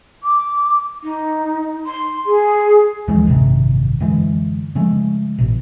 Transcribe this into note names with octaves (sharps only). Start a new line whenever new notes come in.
D6
D#4
C6
G#4
D2 E3 F3 G#3
A1 G2 C3 D#3
F#2 D3 E3 G#3
C#3 F3 G#3 A3
A1 B2